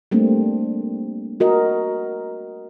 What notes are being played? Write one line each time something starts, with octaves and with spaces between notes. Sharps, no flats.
G3 A3 A#3 C4 D4
F#4 A#4 D#5